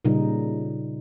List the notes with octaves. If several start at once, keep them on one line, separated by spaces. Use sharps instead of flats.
A#2 C#3 G3 D#4